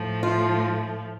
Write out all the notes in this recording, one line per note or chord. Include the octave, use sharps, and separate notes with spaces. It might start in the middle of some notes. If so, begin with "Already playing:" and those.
Already playing: A2 F3 A3
F4